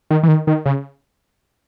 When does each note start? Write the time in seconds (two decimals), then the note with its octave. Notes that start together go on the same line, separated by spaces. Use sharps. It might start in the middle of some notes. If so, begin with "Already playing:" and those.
0.11 D#3
0.23 E3
0.28 D#3
0.47 D#3
0.66 C#3